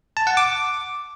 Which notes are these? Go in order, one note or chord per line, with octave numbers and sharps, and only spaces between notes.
A5
F#5
D6